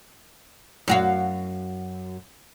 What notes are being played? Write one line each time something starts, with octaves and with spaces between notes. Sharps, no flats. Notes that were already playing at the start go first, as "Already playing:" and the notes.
F#2 F#4 F5